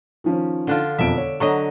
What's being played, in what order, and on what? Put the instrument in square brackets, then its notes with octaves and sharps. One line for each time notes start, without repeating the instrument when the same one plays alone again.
[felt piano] D#3 F3 C#4
[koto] D3 D4 F4
[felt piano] E1 F2 D7 [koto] E5
[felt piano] C#5
[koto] D3 F#3 D#5 [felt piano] C#5 A#5 C#6